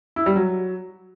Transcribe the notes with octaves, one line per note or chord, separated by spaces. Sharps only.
E4
G3
F#3